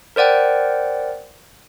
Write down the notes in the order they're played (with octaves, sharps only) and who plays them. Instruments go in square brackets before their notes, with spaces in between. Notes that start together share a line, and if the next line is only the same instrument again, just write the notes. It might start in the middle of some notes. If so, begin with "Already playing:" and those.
[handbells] A#4 C5 D5 F#5 G5